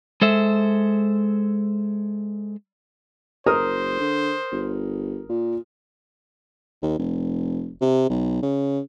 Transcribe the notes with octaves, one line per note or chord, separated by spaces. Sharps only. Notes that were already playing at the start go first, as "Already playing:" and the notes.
G#3 A4 C5 E5
F#1 A#4 C5 D#6 F6
D3
G1
A#2
D#2
F1
C3
B1
C#3